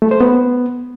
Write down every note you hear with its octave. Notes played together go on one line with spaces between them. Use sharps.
A3
C5
B3